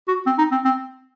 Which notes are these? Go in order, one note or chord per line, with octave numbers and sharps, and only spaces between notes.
F#4
C4
D#4
C4
C4